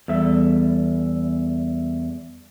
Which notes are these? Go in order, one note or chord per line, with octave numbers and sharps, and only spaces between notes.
E2 G3 A4 E5